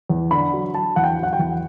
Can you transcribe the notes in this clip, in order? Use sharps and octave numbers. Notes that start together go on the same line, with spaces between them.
E2
D3 B5
F#3
F#3 A5
E2 F#5
G5
F#3 F#5
G5
E2